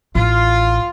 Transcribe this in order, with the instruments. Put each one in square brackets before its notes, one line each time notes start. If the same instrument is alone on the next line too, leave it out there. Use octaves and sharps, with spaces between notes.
[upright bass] A1 [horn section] F4